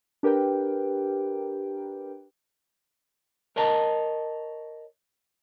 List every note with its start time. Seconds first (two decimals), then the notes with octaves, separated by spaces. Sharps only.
0.23 D4 G4 A#4 B4 G5
3.56 A#4 C#5 D#5 A5